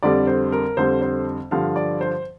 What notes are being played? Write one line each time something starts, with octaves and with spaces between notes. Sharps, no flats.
F2 D3 G3 D5
C5
A#4
F2 D3 G3 C5
C5
G2 D3 F3 F5
D5
C5